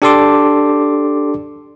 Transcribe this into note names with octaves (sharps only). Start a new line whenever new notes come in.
D4 G4 A4 D5 C6 D6